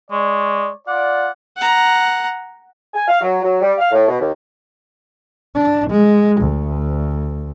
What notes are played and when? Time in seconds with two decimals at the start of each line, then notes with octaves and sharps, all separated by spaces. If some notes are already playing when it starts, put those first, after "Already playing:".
0.11 G#3 C#5 D5
0.88 F4 D5 F#5
1.57 F#5 A#5
2.94 G#5
3.07 F5
3.21 F#3
3.42 F#3
3.61 G3
3.78 F5
3.92 A2
4.07 B2
4.19 D#2
5.55 D4
5.90 G#3
6.41 D2